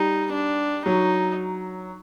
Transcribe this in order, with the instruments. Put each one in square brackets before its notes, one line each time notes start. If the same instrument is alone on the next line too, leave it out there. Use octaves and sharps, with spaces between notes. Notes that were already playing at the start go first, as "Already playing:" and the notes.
Already playing: [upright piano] G3 [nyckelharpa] D#4
[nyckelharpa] D4
[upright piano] F#3 [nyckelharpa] D#4